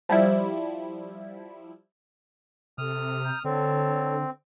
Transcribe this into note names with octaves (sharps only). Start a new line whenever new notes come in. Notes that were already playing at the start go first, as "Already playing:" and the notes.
F3 G3 E4
C3 A4 D#6 F6
A#5 G6
D3 C4 A4 C#5